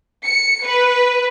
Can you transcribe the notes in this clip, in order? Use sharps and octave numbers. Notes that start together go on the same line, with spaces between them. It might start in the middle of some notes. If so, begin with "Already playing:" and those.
C#7
B4